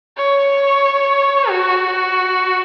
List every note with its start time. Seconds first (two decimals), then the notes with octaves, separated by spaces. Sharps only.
0.17 C#5
1.50 F#4